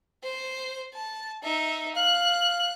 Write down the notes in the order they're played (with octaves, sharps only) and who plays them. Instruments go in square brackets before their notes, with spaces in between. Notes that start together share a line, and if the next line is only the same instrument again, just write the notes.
[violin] C5
A5
D#4 E5
[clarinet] F5 [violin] F#6